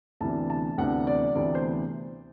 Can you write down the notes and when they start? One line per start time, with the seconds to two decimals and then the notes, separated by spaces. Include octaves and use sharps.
0.21 D2 C3 E3 B3 D4 A5
0.50 A5
0.78 D2 C3 E3 B3 D4 F#5
1.07 D5
1.35 D2 C3 E3 B3 D4 D5
1.55 C5